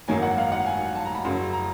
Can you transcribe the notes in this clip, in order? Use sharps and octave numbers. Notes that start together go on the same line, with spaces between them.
G#1 F#2 D#3 F#3 A#3 G#5
F#5
F5
F#5
G#5
A5
A#5
B5
F#1 F#2 C#3 F#3 C6
A#5